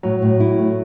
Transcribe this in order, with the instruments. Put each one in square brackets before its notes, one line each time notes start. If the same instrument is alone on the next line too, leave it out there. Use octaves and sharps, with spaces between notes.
[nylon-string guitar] A2 [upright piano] F#3
[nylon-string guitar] A2
E4
A3